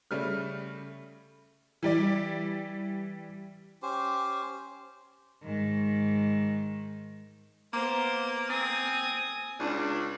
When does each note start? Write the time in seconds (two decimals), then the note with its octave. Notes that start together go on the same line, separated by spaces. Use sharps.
0.11 C#3 G3 A3 F6
1.83 E3 G3 D5
3.82 C#4 G4 C5
5.44 G#2 D#3
7.73 A#3 B3 C5
8.50 C4 G#5 D#6
9.60 C#2 D4